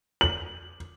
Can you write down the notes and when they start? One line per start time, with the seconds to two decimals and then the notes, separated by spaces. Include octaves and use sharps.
0.21 F#7